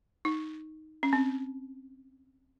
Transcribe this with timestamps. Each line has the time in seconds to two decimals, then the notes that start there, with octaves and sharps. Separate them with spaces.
0.25 D#4
1.03 C#4
1.13 C4